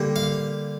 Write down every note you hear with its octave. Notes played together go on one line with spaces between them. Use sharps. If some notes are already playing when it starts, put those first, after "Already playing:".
Already playing: D3 G3 A#3
F5